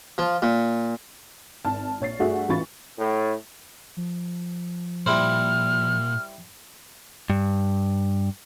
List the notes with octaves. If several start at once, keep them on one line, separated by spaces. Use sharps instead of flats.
F3
A#2
G#1 A5 F6
A#1 C#5 A6 C7
G2 A3 F#4 G#4 E5
A1 E3 F4 B5 C#6 A6
A2
F3
A#2 G3 E4 C5 F6
G2